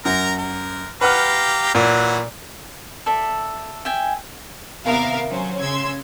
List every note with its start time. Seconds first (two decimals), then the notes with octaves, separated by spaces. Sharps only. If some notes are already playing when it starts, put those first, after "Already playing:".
0.05 F#2 A#4 A#5
0.39 A#4
1.01 G4 B4 F5 F#5 A#5 F6
1.75 A#2 E3 F#3 F#4
3.06 A4 D5 E5
3.85 E5 G5 G#5
4.86 D#2 C3 B3 A#4 E5 F5
5.28 F#3 C#4 C5
5.59 C#3 C6 E6 G#6